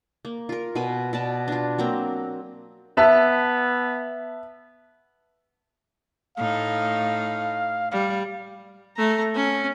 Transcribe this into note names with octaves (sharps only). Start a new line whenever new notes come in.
A#3
F4 A#4
B2 F5 G#5 B5
B2 D5 A5
D4 F4
F#3 A#3 C4 A#5
B3 E5 A5
A2 A3 D#4 F5
G3 F5
A3 A#5
C#4